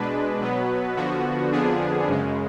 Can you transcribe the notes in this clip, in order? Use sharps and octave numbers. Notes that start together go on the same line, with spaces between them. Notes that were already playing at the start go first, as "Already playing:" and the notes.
Already playing: B2 G#3 D4 B4
B2 F#3 B3
D3 F3 B3 F#4
F2 D3 F3 B3 D4 G#4
F#2 C#3 G#3